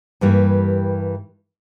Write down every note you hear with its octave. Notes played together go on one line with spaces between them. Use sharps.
G2 E3 G3 A#3